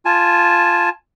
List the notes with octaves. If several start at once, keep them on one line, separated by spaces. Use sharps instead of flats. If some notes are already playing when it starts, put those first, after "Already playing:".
F4 G#5 A5